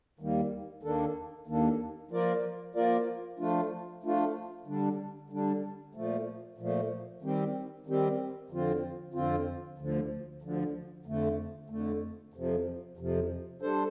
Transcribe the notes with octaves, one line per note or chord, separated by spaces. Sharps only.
D#2 D#3 G3 A#3
D#2 D#3 A#3 D4 A4
D#2 D#3 A#3 D4 A4
F3 A#3 F4 A#4 D5
F3 A#3 F4 A#4 D5
F3 A3 D4 F4
F3 A3 D4 F4
D3 G3 D4
D3 G3 D4
A#2 F3 A3
A#2 F3 A3
D#3 G3 C4 G4
D#3 G3 C4 G4
F2 D3 F3 C4 F4
F2 D3 F3 C4 F4
D2 D3 F3
D2 D3 F3
F2 D3 A3
F2 D3 A3
F2 C3 F3
F2 C3 F3
G3 D4 A4 C5